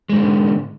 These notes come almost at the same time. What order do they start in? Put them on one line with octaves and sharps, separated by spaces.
G#3 G#2 D3